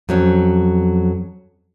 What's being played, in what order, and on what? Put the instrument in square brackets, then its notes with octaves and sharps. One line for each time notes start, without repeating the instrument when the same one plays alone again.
[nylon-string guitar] F2 F#3 C#4